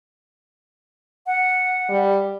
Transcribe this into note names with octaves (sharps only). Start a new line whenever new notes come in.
F#5
G3